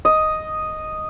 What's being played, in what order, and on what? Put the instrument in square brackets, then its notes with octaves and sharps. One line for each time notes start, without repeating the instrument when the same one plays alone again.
[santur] D#5